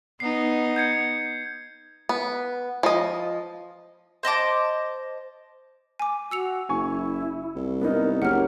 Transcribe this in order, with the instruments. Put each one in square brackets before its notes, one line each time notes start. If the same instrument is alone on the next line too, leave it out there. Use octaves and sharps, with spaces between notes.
[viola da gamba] B3 D#4 [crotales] C7
[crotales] G6 G#6 C#7
[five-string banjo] B3
F3 D#5
[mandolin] C5 D#5 A5 D6
[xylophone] G#5 D6
[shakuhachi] F#4 [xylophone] E6 C#7 F7
[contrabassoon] F#1 [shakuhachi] E4 [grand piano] G#5 C#6
[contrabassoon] C2
[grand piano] B3 D#4 [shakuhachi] A#4
[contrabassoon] F#1 [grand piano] G4 A#4 [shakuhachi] C#5 [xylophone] F#5 F6